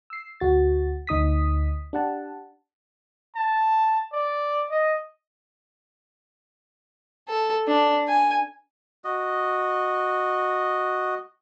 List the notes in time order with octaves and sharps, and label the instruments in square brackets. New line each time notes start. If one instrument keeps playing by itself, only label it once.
[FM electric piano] E6 C7
D2 F#4 A6
D2 D#4 D#6 B6
D4 G4 F#5 A5
[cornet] A5
D5
D#5
[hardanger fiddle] A4
D4
G#5
[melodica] F#4 D#5